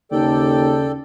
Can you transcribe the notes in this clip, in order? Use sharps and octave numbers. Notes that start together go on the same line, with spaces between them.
D#2 C#3 A4 D5 G5